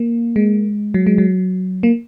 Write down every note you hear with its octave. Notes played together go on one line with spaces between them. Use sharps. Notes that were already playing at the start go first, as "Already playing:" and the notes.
Already playing: A#3
G#3
F#3
G#3
F#3
A#3